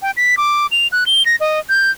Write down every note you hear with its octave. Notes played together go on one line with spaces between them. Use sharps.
G5
B6
D6
F7
F#6
G7
A#6
D#5
G6